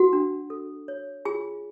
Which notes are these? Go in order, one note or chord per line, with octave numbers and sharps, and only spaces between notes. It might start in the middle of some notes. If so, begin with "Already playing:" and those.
Already playing: F#4 F#5
D4
A4
C#5
F4 G#4 G#5